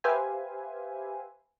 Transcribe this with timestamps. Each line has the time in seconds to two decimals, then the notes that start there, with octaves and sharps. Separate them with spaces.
0.04 G4 B4 C5 E5 F5 G#5